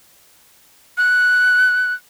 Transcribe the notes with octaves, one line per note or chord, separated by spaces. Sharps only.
F#6